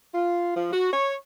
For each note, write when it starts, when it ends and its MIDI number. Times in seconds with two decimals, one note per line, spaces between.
0.14 0.55 65
0.56 0.68 53
0.72 0.88 66
0.92 1.14 73